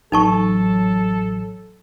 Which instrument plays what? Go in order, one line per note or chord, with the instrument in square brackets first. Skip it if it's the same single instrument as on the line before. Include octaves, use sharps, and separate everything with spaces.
[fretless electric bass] A1 [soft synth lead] F#3 [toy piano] D#4 A5 C#6 [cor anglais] A4